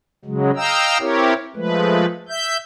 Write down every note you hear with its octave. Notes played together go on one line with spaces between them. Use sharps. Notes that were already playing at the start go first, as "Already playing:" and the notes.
C#3 F#3 G#3
D#5 F5 G5 A#5 E6
C4 E4 G4 A#4 C#5
F3 G#3 A3 B4
E5 G6